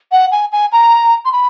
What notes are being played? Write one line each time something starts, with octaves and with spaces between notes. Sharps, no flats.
F#5
G#5
G#5
A#5
C6
B5